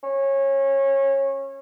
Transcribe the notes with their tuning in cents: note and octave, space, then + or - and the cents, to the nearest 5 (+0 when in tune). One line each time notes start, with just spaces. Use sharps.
C#4 -20